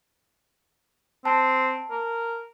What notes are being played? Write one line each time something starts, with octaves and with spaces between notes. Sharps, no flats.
C4 A5
A#4